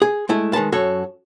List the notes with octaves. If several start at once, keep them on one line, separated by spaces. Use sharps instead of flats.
G#4
G#3 A3 E4
D#3 G#3 B4 A5
F#2 F#4 A4 C#5